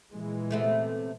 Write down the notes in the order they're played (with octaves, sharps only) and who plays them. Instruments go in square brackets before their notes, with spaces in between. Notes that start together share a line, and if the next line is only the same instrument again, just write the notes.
[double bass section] A#2 E3 G#3
[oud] C3 A3 B3